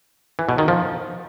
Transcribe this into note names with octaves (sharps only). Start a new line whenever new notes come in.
E3
B2
D#3
F3